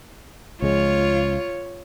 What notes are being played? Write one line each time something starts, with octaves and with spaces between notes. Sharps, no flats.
C#2 F3 G#3 F4 C#5